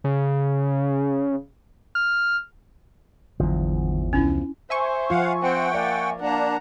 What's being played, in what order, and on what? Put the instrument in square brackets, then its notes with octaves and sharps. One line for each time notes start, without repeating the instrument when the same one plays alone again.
[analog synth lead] C#3
F6
[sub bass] G#1 [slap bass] E2 F3 [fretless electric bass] D3 F#3
[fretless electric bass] C2 [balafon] C#4 D4 E4
[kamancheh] C5 [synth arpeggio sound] E5 G#5 C#6
[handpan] F3 F4 [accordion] F5 F#5
[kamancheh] C4 [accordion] F#5 G5
[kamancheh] A#3 [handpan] D5
[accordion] A#3 D4 [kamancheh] F#5 A#5